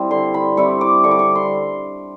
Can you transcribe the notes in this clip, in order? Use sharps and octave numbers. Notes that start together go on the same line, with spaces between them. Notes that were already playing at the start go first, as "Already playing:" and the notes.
Already playing: G3 C4 E4
D3 C6
B5
G3 C4 E4 C#6
D6
D3 C#6
D6
C#6
C6